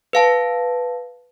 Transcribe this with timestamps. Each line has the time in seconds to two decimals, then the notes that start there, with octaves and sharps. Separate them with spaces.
0.13 B4 F5 A5